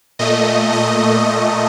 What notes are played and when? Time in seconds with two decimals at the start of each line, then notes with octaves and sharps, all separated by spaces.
0.19 A#2 A3 D#5
0.73 D#5
1.27 D#5